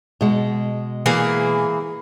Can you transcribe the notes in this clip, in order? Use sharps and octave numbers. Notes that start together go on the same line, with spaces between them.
B2 G#3
E3 A#3 G#4